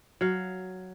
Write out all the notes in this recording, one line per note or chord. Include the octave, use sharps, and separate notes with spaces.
F#3 F5